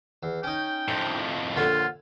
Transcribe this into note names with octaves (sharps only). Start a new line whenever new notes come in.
E2
C#4 D#4 G5
F2 A2
A#1 D3 F4 C#5